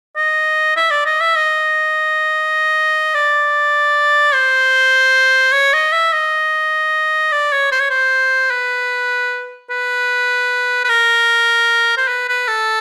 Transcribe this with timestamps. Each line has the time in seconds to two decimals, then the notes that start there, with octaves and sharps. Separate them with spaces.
0.17 D#5
0.77 E5
0.91 D5
1.06 D#5
1.21 E5
1.36 D#5
3.15 D5
4.34 C5
5.52 C#5
5.73 D#5
5.93 E5
6.13 D#5
7.32 D5
7.52 C#5
7.72 C5
7.80 C#5
7.90 C5
8.51 B4
9.70 B4
10.84 B4
10.89 A#4
11.97 C5
12.08 B4
12.28 B4
12.48 A4